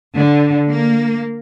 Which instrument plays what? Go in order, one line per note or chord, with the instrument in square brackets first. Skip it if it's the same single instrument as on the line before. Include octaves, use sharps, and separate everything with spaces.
[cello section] D3
A#3